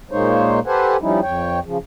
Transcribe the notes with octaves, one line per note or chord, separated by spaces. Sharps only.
A#2 G#3 A#3 D#4 C5 C#5
G4 A4 B4 C5 F#5 G#5
F3 G3 C#4 D#4 E4
F2 C#5 G5
C#3 F3